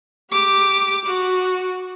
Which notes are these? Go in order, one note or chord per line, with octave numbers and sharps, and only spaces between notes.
G4 D6
F#4